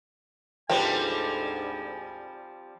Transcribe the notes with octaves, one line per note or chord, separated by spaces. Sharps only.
D2 G#2 F3 G3 C4 B4 G5 G#5